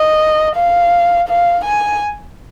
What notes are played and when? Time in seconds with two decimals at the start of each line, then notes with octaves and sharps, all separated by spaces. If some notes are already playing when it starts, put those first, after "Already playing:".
Already playing: D#5
0.56 F5
1.29 F5
1.65 G#5